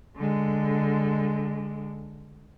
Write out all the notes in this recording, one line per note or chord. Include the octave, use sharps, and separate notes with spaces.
D3 G#3